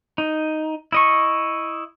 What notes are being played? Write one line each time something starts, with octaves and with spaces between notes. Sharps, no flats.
D#4
E4 D#5 C#6